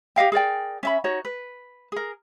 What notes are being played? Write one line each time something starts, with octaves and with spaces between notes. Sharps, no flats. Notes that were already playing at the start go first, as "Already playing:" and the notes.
G4 D#5 F5 G5
G#4 A#4 D5 G5
C#4 E5 B5
D#4 F#4 C#5
B4
G#4 A#4